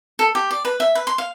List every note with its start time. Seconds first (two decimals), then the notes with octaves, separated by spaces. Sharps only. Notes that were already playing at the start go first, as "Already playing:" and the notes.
0.19 A4
0.35 G4
0.51 D5
0.65 B4
0.80 E5
0.95 B4
1.07 C6
1.18 F5